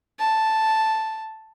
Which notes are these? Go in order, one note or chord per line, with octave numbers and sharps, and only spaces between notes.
A5